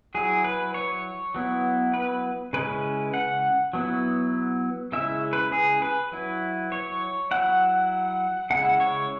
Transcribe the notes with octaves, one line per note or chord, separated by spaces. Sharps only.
F#3 E4 G#4
B4
C#5
F#3 B3 E4
B4
C#3 G#3 C#4 E4 B4
F#5
F#3 B3 E4
C#3 G#3 C#4 E4 E5
B4
G#4
B4
F#3 E4
C#5
F#3 E4 F#5
C#3 G#3 E4 F#5
C#5